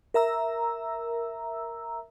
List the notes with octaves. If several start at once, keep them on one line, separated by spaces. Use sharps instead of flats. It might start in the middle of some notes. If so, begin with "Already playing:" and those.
A#4 E5 A#5 E6